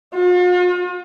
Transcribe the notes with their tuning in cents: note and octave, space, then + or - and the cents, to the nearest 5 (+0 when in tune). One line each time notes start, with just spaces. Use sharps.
F4 +45